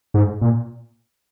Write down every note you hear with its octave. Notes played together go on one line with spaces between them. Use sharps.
G#2
A#2